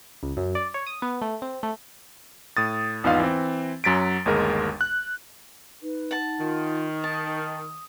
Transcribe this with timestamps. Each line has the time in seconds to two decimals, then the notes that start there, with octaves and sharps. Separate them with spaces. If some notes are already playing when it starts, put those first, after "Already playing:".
0.23 C#2
0.37 F#2
0.55 D5
0.74 C#5
0.87 D#6
1.02 B3
1.22 A3
1.42 C4
1.63 A3
2.57 A2 D#6 A6
3.04 G#1 E2 B3 D#4 F4 F5
3.20 E3 C4
3.84 F#2 F#3 A6 B6 D7
4.26 G1 D#2 G#3 A#4
4.81 F#6
5.82 D#4 B4
6.11 F#5 A5
6.39 D#3 F4
7.04 A5 D#6